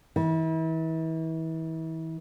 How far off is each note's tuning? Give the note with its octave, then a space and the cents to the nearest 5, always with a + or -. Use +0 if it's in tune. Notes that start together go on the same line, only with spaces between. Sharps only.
E3 -35